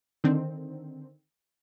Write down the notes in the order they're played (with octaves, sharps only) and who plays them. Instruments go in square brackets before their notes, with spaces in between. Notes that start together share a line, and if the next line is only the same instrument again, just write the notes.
[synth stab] D3 D#3 C4